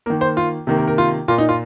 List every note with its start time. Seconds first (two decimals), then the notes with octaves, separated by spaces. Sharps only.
0.06 D#3 A#3 A#4
0.21 C5
0.37 F4
0.67 C3 D#3 A#3
0.77 A#4
0.88 A#4
0.98 F4
1.28 A#2 A#3 F4
1.38 D#4
1.49 F4